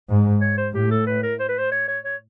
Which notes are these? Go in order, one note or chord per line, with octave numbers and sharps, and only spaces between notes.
G#2
C#5
C5
A2 G4
A4
B4
A#4
C5
B4
C5
C#5
C#5
C#5